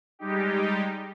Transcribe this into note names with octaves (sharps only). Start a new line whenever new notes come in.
G3 G#3 D#4 G4